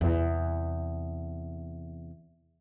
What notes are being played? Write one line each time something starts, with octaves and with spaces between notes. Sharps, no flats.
E2 C3